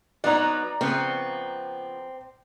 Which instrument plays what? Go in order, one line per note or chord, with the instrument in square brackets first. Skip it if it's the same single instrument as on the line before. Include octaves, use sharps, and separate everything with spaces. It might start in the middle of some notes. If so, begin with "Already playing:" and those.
[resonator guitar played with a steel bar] F#3 B3 D#4 [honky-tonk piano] D5 A#5
[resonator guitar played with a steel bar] C#3 F3 B3 [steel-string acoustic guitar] C4